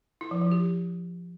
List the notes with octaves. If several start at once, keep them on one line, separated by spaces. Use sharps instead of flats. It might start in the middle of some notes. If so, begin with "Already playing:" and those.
E4
F3
F3
G4